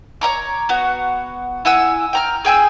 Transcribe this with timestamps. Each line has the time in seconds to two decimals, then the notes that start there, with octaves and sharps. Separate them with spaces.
0.21 C#5 D#5 A#5 D6
0.69 B3 F#4
1.65 E4 F#5 G#5 E6
2.13 G5 A#5 F6
2.45 G#4 G5 G#5 E6